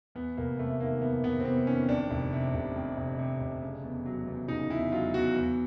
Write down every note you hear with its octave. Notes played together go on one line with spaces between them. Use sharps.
E2 B3
F1 A#3
C3 A3
D#3 A#3
E2 B3
F1 B3
C4
C3 B3
D#3 C#4
F2 D4
F1
C3
F1
F2
F1
C3
F1
C#3
E2
F#3
E2
C#3 D#4
E2 E4
F#3 F4
E2 F#4
E2